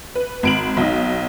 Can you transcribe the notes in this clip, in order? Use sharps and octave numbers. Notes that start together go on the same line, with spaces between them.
B4
G#1 D7 F#7
B1 D#4